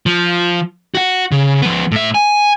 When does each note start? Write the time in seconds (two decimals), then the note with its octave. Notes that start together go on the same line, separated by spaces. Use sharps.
0.06 F3
0.95 F#4 F#5
1.32 C#3
1.62 F3 B3
1.92 A2 E5
2.14 G#5